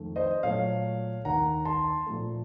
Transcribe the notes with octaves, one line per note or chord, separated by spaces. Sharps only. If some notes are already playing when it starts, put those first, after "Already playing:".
Already playing: F2 D#3 A3
C5 D#5
A#2 F#3 A3 C#5 F5
D#2 D#3 A#3 F#5 A#5
A5 C6
A#2 F3 A3